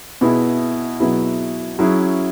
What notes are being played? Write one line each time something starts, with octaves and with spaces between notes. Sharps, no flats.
B2 B3 E4 G#4
B2 F#3 B3 E4 G#4
F#3 C#4 E4 G#4